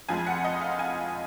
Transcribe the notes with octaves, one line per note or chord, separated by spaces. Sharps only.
F2 F3 G#3 G#5
F#5
D#5
F5
G#5